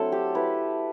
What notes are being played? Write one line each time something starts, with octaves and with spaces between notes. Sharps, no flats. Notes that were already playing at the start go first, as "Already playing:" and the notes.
Already playing: F#3 A3 C4 D4 E4 A4
G4
A3 E4 B4